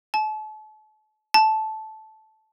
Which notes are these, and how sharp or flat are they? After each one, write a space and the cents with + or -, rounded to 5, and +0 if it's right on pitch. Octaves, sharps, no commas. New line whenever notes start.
A5 -40
A5 -10